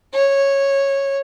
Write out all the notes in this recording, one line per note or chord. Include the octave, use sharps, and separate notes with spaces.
C#5